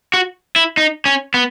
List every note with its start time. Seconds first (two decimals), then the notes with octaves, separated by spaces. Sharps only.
0.14 F#4
0.56 E4
0.77 D#4
1.05 C#4
1.34 B3